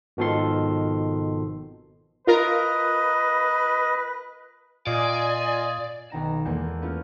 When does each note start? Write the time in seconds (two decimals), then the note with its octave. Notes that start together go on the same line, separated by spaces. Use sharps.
0.17 G#1 B2 D#3 F3 A4 C6
2.27 F4 A#4 B4 D#5 A#5
4.87 A#2 F4 D5 D#5 G#5
6.10 B1 D#3 A#5 E7
6.45 E2 G#3 A#3 A4 G6
6.82 A3 B3 C#4 E4 F4